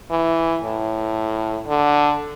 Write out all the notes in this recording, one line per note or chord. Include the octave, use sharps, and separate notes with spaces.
E3
A2
D3